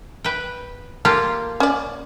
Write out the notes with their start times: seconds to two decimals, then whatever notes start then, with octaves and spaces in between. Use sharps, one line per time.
0.24 B4 G5
1.05 A#3 F4 G4 A4
1.60 C#4 D5